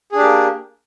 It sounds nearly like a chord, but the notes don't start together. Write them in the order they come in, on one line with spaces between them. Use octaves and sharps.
G#4 D4 G4 A#3